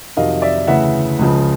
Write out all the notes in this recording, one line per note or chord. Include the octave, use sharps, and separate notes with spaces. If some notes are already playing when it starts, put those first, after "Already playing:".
F2 C3 D#3 F#3 D#5 F5
D5 E5
D2 C#3 E3 E5 F#5
C#2 C#3 F3